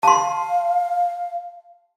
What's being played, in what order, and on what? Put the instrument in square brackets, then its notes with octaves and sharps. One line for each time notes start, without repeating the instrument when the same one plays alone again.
[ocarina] F5 [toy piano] A5 C6